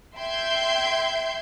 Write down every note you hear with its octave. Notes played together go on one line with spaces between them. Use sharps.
E5 G5 C6 G6 G#6